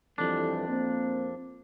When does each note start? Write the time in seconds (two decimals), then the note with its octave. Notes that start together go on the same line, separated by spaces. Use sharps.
0.18 F2 E3 G3 D4 A4
0.69 A#3 C4